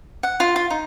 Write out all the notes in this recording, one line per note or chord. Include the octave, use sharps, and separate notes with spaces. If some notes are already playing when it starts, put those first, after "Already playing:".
F#5
F4
F4
D#4